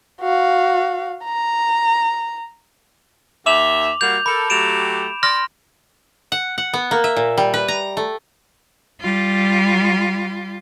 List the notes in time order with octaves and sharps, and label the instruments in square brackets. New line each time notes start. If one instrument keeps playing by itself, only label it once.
[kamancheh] F#4 F5
A#5
[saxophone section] D#2 E5 [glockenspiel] D6 F7 F#7
[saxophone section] G3 A#3 F#4 [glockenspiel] G6 F7
[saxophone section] A4 A#4 [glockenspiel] B5
[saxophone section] F#3 A3 G4 [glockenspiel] D7 E7 F7
[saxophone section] D5 [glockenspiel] C6 F6 A#6
[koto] F#5
F#5
B3
A#3
E5
A#2
G3
B4
A#5
A3
[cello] G3 F4